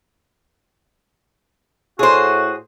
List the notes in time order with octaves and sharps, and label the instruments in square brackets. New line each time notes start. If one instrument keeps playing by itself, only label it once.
[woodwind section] A2 F#4 [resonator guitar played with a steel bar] G#4 C5